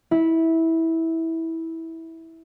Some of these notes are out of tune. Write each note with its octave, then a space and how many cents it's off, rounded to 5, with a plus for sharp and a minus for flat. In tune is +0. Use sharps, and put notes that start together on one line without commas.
E4 -15